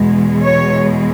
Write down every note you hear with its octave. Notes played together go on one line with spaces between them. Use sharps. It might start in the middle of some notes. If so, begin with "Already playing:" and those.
Already playing: E2 B2 G#3
C#5